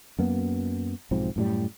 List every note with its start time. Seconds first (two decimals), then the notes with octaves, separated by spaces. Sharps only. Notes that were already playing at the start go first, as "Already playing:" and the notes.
0.19 F#2 A#3 B3
1.11 B1 G#2 F3 C4
1.36 F#2 A2 G3